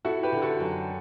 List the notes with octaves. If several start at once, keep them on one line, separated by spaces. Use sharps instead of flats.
E4 F#4 A4
G4 B4
D3
F#4 A4
F#2